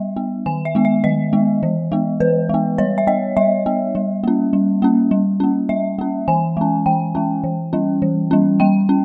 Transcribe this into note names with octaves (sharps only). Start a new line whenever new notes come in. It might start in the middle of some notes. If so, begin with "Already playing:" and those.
Already playing: G3 B3 E5
B3
D#3 G#5
E5
G#3 B3
E5
D#3 D#5
G#3 B3
E3
G#3 B3
E3 B4
G#3 B3
G3 C#5
E5
B3 D#5
G3 E5
B3
G3
A#3 C#4
G3
A#3 C#4
G3
A#3 C#4
G3 E5
A#3 C#4
E3 G#5
G#3 C#4
E3 G5
G#3 C#4
E3
G3 C#4
E3
G3 C#4
G3 G5
C#4